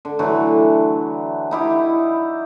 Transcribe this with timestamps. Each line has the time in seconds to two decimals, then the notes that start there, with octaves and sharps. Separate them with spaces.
0.05 D3
0.19 D3 E3 F#3 A3
1.51 D#4 E4 G4